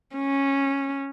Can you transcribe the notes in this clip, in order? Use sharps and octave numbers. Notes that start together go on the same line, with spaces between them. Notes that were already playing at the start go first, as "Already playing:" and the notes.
C#4